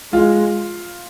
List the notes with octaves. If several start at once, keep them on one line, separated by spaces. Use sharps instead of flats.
G#3 F4